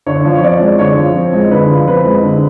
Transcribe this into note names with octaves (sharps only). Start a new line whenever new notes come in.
D3 C#5
F3
C#5
C4 D5
G#3
D3 C#5
F3
C4
G#3
D3 B4
F3
C4 B4
G#3
D3